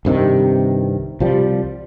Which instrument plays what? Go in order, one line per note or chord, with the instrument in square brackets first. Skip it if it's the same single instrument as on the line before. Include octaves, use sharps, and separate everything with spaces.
[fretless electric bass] C2 G2 C3 D#3
C2 F3 G3